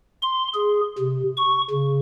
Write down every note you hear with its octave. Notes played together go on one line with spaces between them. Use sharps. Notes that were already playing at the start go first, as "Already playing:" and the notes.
C6
G#4
C3
C#6
C#3